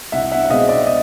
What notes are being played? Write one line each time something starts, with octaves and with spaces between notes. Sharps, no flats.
C2 E5 F#5
E5 F#5
F#5
B2 G#3 C4 D#5 F5
D5 E5
D#5